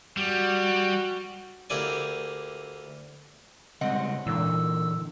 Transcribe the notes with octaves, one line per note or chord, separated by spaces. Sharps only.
G3 F#4
D2 A#3 E4 G4 D5 G#5
C#3 G3 G#3 C4 D#5 F#5
A#2 D3 E3 E6